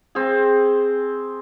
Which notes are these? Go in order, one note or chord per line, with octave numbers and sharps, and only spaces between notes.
C4 G#4